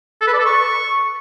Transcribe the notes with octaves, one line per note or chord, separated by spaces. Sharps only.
A4
B4
D5
A4
C#6